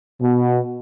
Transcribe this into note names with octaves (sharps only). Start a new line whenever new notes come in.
B2